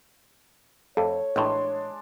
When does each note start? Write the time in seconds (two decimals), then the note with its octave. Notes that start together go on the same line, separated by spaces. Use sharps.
0.97 F2 A4 C#5
1.36 A1 A2 G#3 D4 C6